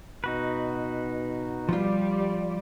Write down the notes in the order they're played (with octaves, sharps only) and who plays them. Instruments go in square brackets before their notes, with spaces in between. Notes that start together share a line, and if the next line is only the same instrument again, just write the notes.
[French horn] B2 [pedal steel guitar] D#4 F#4 B4
[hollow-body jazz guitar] F3 F4 [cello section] G3 D5